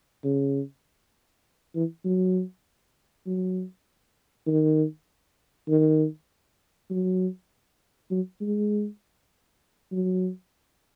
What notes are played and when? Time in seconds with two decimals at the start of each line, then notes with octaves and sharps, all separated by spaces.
0.24 C#3
1.75 E3
2.05 F#3
3.26 F#3
4.47 D#3
5.69 D#3
6.90 F#3
8.11 F#3
8.41 G#3
9.92 F#3